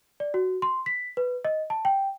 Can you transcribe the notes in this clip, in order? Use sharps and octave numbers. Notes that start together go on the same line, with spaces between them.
D5
F#4
C6
B6
B4
D#5
A5
G5